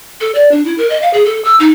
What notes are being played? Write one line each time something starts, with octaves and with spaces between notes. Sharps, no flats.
A4
D5
D4
E4
A#4
D#5
F5
G#4
A4
E6
D#4